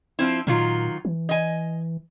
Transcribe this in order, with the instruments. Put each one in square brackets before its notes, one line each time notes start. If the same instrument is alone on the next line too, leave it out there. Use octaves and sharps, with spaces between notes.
[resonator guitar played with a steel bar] F3 C4 E4
[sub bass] A#2 [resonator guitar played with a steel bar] D#3 F#3 F4
[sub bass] E3
[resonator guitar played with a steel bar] D#5 G#5